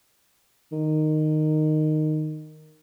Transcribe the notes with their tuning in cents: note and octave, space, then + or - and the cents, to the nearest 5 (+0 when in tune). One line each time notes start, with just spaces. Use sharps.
D#3 -10